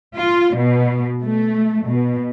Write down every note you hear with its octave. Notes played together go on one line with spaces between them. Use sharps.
F4
B2
A3
B2